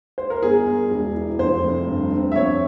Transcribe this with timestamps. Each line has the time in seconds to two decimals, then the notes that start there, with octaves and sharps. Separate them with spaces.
0.18 C5
0.30 A#4
0.42 G1 G#4
0.66 G1
0.91 E1
1.15 E3
1.39 F1 C5
1.64 F1
1.88 G2
2.12 C4
2.32 E5
2.36 F2 C#5